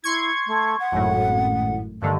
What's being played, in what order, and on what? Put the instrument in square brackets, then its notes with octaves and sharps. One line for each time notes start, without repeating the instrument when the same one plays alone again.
[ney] E4 [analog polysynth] C6 C#6 G#6
[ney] A3
F#5
[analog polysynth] G#1 F#2 A2
[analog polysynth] G2 D3 D#3 [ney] A3